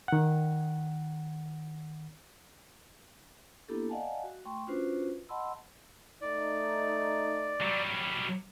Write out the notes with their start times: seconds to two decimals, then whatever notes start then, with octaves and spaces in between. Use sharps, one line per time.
0.08 D#3 F#5
3.68 A#3 B3 D4 E4 G4 A4
3.89 D5 D#5 F5 F#5 G#5 A5
4.24 F#4
4.45 A3 G5 C6 C#6
4.67 C#4 D4 F4 F#4 B4 C5
5.29 D#5 F#5 A5 B5 C6 E6
6.22 A3 D#4 D5
7.61 F#3 G3